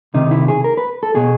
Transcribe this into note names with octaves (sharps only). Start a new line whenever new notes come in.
C2 C3 D#3 D#4
E4
G#4
A#4
B4
A4
B2 G#4